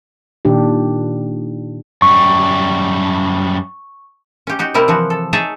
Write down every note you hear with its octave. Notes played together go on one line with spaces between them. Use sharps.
A#2 D#3 D4 G4
F#2 G3 C#6
C#4 G4
D#4 F#4 G4
C3 G3 E4 A#4
E3 F3 F#4
A4
D#4 G#4 C#5 E5 A5 A#5